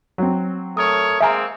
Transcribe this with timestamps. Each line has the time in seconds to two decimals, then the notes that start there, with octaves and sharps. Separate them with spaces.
0.18 F#3 C4
0.77 A3 A#4 C#5 D#6
1.21 G#3 A#3 C4 E5 G#5 A#5